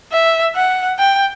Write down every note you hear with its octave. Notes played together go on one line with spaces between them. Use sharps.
E5
F#5
G5